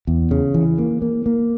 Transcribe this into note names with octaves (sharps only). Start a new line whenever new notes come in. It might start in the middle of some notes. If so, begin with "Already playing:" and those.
E2
C#3
E3
A#3
A#3
A#3